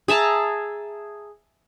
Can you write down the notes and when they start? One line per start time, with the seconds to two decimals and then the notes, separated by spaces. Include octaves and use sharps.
0.08 G#4 E5 A5 A#5